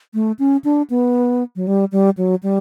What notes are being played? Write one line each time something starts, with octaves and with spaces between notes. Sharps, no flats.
A3
C#4
D4
B3
F#3
G3
G3
F#3
G3